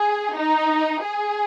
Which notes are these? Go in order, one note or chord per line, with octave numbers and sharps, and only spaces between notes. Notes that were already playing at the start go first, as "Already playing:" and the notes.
Already playing: G#4
D#4
G#4